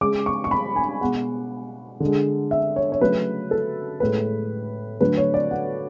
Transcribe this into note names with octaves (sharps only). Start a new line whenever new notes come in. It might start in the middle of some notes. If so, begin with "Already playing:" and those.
C#3 G#3 D6
C#6
C#6
B5
G#5
B2 G#3 F#5
D3
G#3
E5
C#5
C#5
C#3 F#3 A3 B4
A4
A2 G#3 B4
D3 F#3 A3 B4
C#5
D5
F#5